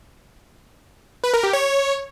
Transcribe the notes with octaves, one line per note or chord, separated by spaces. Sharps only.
B4
A#4
G4
C#5